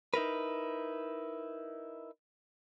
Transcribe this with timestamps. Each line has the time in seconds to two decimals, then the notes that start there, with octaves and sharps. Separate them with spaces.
0.14 D#4 E4 A#4 B4